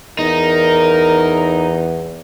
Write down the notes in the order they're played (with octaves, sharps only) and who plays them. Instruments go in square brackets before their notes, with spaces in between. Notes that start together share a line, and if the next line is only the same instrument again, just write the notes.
[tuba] E2 [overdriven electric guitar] D#4 [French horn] A#4